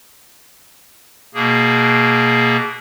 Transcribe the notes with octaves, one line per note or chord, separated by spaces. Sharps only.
B2 A#3 G#4